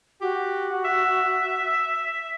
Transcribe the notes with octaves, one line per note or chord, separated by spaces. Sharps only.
F#4 G4
E5